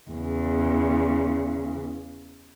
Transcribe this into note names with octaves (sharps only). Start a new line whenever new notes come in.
E2 C#3